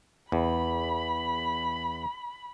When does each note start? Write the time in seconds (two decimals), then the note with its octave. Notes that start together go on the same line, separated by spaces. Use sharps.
0.32 E2 B5